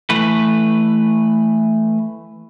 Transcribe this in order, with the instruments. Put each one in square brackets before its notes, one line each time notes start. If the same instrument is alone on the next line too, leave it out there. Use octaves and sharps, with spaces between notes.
[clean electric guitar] E3 A3 B4